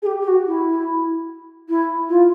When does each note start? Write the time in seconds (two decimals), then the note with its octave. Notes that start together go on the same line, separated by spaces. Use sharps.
0.02 G#4
0.06 G4
0.22 G4
0.28 F#4
0.47 E4
1.69 E4
2.09 F4